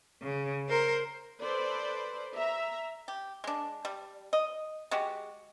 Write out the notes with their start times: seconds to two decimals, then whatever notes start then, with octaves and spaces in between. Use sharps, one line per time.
0.22 C#3
0.69 A#4 C5
1.41 A4 B4 C5 D5
2.36 E5 A#5
3.08 G4
3.44 G#3 D4
3.85 G3
4.33 D#5
4.91 G#3 F#4 G4